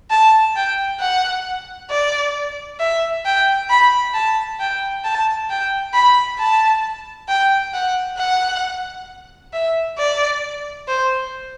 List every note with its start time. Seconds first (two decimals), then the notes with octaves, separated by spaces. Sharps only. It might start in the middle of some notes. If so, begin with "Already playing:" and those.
0.10 A5
0.56 G5
1.00 F#5
1.90 D5
2.79 E5
3.25 G5
3.70 B5
4.14 A5
4.60 G5
5.04 A5
5.50 G5
5.94 B5
6.39 A5
7.29 G5
7.73 F#5
8.18 F#5
9.53 E5
9.98 D5
10.88 C5